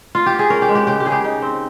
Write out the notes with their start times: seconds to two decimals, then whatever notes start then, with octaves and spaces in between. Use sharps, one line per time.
0.15 F4
0.26 G4
0.39 G#4
0.50 C#4 A#4
0.62 G4
0.69 G#3
0.75 G4
0.87 C#3 G4
1.00 G4
1.05 C#3 G#4
1.12 G4
1.24 D#4
1.42 C4